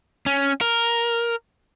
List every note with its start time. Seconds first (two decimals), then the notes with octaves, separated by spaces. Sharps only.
0.26 C#4
0.61 A#4